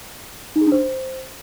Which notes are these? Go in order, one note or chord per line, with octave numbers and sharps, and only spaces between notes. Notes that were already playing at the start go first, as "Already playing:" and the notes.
D#4
G#4
D4
C5